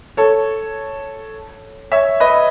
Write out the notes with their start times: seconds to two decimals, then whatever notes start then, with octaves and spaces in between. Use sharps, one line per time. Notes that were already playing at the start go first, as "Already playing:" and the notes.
0.17 A4 C#5
1.92 C#5 E5
2.20 B4 D#5